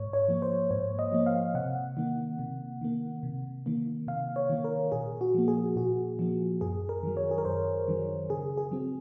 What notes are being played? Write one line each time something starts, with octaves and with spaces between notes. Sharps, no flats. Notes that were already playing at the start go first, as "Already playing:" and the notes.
Already playing: G#2 C#5
C#5
F3 A#3
C5
G#2 C#5
D#5
F3 A#3
F5
C3 F#5
D#3 A#3
C3
D#3 A#3
C3
D#3 A#3
C3 F5
C#5
D#3 A#3
A#4
A#2 G#4
F#4
F3 A#3
G#4
A#2 F#4
F3 A#3
F#2 G#4
A#4
D#3 F#3
C#5
G#4
A#4
F#2 C5
D#3 F#3
C#3 G#4
G#4
F#3 C4